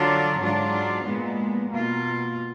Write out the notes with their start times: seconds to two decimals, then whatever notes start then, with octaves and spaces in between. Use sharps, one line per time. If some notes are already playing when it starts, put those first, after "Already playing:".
Already playing: D3 F#3 D4 F4
0.40 G#2 F#3 D4 F4
1.05 A#2 G#3 B3
1.70 B2 A#3 F4